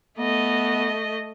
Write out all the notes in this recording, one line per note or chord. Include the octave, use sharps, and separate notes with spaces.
A3 B3 D#5